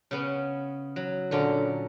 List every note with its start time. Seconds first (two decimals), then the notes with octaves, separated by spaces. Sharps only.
0.11 C#3 B3 C#4
0.96 F#3
1.31 A#2 D3 C#4 D5